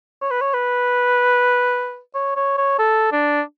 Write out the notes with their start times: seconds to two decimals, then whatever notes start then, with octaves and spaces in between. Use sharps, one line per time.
0.21 C#5
0.30 B4
0.41 C#5
0.54 B4
2.14 C#5
2.36 C#5
2.57 C#5
2.79 A4
3.12 D4